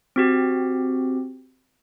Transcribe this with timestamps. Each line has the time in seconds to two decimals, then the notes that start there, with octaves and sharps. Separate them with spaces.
0.16 C4 F#4 G4